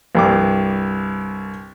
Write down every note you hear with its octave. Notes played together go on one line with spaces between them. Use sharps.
C2 G2 D6